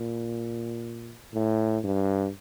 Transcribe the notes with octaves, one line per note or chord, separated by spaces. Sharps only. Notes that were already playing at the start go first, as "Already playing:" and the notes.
Already playing: A#2
A2
G2